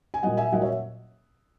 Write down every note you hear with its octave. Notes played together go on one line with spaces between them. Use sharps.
G#5
A#2 F#3 D#5 F#5
E5 G#5
A#2 F#3 D#5 F#5
C#5 E5